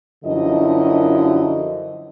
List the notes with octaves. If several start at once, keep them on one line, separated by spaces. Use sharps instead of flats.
F#2 D3 F3 E4 D#5